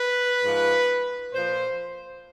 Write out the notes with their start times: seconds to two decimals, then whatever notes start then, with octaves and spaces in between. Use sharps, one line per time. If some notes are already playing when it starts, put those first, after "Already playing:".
Already playing: B4
0.43 G#2 F3
1.33 A#2 F3 C5